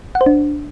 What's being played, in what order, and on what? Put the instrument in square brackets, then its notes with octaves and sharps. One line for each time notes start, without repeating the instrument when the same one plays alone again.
[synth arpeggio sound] F#5
C5
D4